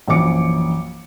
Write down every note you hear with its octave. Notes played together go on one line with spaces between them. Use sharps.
A#1 F#2 E3 D6 C#7